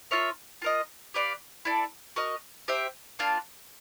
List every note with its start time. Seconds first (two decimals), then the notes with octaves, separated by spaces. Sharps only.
0.11 F4 A#4 C#5 E5
0.62 F4 A#4 D#5
1.14 G4 B4 D5 F5
1.65 E4 A4 D5
2.16 F#4 A#4 D#5
2.68 G4 C5 E5 G5
3.19 A#3 D4 F4